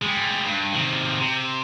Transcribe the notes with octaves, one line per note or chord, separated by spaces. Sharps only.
G3 G#3
G2
C3 D#3
C3